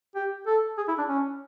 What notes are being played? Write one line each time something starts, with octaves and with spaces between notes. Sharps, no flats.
G4
A4
G#4
E4
D4
C#4